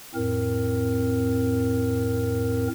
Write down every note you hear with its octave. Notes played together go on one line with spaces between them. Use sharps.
F2 A2 C4 A#4